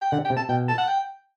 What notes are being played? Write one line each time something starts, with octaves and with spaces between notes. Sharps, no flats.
G5
D3 F#5
G5
C3
A5
B2 G5
A5
F#5
G5